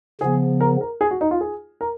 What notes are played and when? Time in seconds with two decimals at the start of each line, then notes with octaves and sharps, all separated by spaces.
0.21 C#3 F3 B3 G#4
0.61 A#4
0.81 A#4
1.01 G#4
1.11 F#4
1.21 D#4
1.31 F4
1.41 G#4
1.81 A#4